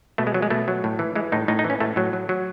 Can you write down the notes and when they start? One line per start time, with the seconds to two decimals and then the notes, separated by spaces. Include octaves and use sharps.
0.18 B2 A3
0.27 G#3
0.34 F#3
0.42 G#3
0.50 B2 A3
0.68 F#3
0.84 A2
0.99 E3
1.15 E3 G#3
1.32 A2 D#4
1.48 A2 D#4
1.59 D#4
1.64 E3
1.70 C#4
1.80 A2 A3
1.96 A2 F#3
2.13 F#3
2.29 F#3